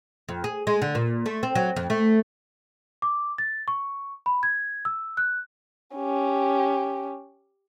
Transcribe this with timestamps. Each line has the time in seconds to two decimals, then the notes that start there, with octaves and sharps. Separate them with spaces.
0.29 F2
0.44 G#4
0.67 G#3
0.82 D3
0.95 A#2
1.26 A3
1.43 C4
1.55 F#3
1.76 F2
1.90 A3
3.02 D6
3.38 A6
3.68 C#6
4.26 B5
4.43 G#6
4.85 E6
5.17 F#6
5.96 C#4 G4